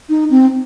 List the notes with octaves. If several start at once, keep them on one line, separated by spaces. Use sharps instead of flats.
D#4
C4